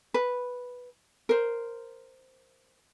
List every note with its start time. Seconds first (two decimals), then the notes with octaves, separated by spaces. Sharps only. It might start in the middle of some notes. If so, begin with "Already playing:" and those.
0.14 B4
1.29 A#4 C5